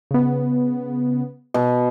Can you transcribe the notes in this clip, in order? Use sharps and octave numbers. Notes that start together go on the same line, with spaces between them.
C#3 B3
B2